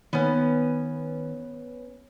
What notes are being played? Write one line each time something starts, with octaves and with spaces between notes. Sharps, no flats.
D#3 B3 C#4